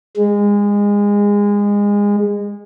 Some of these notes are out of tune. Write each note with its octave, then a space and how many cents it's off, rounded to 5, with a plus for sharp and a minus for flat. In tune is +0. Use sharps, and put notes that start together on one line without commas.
G#3 -25